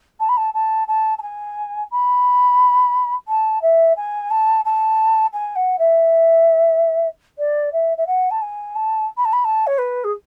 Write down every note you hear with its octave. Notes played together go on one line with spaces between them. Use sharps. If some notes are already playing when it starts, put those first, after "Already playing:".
A5
B5
A5
A5
A5
A5
G#5
B5
A5
E5
G#5
A5
A5
G#5
F#5
E5
D5
E5
E5
F#5
A5
G#5
A5
B5
A5
B5
A5
C#5
B4
G#4